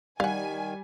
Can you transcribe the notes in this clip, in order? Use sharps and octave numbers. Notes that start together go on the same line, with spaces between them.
D#3 G3 F5 F#5 G#5